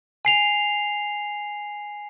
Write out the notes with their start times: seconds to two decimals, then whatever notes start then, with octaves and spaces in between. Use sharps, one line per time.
0.25 G#5 C7 F7